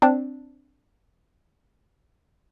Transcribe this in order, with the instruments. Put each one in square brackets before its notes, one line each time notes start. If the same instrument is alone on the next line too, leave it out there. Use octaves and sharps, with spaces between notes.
[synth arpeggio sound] C4 D4